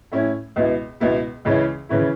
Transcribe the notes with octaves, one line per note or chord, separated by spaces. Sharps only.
A2 A3 C#4 E4
C#2 B2 B3 E4
C#2 B2 B3 E4
C#2 C#3 E3 C#4 E4
C#3 E3 C#4 E4